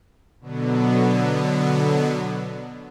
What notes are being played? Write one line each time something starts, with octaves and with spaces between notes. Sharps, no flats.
B2 D3 F#3 B3